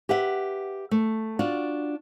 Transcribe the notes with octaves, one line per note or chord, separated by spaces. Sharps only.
G4 B4 E5 F#5
A3
D4 F4 F#4